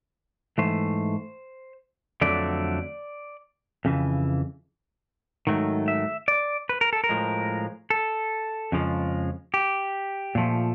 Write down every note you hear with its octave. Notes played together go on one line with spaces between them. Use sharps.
G#2 E3 A3 C5
F2 D3 F#3 A3 D5
F2 C#3 E3
G#2 D#3 F#3 A3
E5
D5
B4
A#4
A4
A#4
A2 F3 G#3
A4
F2 C#3 F3 G#3
G4
A#2 F3 A3